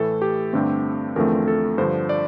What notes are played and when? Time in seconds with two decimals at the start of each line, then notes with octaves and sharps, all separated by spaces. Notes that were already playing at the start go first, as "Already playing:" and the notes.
Already playing: A2 E3 A3 A4
0.22 G4
0.53 G2 D3 A3 C4
1.16 E2 D3 F3 A3 C4 A#4
1.48 A4
1.78 G2 D3 F3 C5
2.09 D5